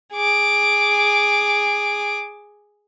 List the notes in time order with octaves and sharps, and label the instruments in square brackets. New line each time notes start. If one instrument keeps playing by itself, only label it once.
[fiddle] G#4 D6